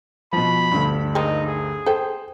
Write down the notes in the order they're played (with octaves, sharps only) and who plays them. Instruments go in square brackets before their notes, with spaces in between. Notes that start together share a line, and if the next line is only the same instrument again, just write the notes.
[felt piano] B2 F3 [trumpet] B5
[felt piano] D2 G2
[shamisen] D#3 F3 G#3 [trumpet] D#4
[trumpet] G#4
[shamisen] A4 G5 [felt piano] C5